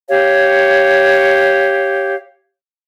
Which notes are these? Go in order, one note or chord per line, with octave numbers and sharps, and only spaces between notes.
G4 C#5 F5